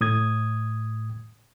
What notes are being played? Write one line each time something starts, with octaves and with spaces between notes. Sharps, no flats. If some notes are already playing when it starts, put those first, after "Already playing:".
A2 D#6 G#6